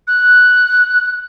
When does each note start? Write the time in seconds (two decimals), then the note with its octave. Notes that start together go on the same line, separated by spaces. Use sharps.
0.07 F#6